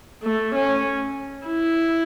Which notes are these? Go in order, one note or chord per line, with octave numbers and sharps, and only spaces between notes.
A3
C#4
E4